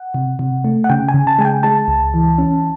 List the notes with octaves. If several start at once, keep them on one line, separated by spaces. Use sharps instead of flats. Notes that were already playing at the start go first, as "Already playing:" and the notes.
Already playing: F#5
C3
C3
A3
F#5
C#3 G5
G#5
C#3
A5
G#3 G#5
G5
G#3 A5
C#2
E3
C#4